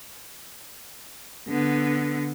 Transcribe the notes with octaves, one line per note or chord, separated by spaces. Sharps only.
D3 B3